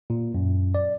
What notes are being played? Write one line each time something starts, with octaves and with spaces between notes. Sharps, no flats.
A#2
F#2
D5